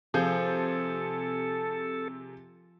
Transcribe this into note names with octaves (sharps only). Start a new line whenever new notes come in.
C3 F3 G#4 A4 G6